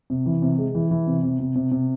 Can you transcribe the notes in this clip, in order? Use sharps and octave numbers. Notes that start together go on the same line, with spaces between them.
C3
E3
C3
G#3
E3
E3
C3
C3
C3
C3
C3